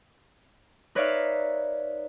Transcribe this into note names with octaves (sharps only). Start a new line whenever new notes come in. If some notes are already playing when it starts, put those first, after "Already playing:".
D#4 B4 C#5 D5 E5 F5